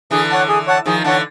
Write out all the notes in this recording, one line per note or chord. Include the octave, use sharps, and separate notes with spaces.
D3 E3 G#4
C#5 F#5 A5
G#4
C#5 F#5 A5
D#3 F3 G#4
D3 E3 C#5 F#5 A5